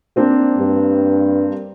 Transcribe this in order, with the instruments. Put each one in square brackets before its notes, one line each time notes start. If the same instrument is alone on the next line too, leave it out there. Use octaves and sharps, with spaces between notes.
[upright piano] A#3 C4 D4
[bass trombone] G2